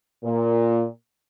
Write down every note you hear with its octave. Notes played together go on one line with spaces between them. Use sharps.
A#2